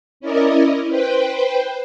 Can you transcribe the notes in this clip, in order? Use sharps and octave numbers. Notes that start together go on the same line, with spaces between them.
C#4 E4 A#4 D5 D#5
B4 C5 G5